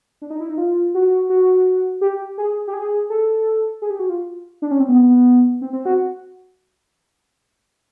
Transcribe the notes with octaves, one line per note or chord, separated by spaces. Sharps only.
D4
D#4
E4
D#4
F4
F#4
F#4
G4
G#4
G4
G#4
A4
G#4
G4
F#4
F4
D4
C#4
C4
B3
C4
C4
F#4